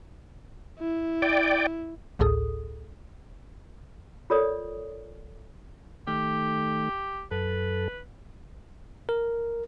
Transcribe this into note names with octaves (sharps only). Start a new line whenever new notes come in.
E4
D5 G5
A1 D2 A2 G#4 A4 D#6
F4 A4 A#4 C#5 D5 D#6
D#3 A3 G4
F#2 A4 B4
A#4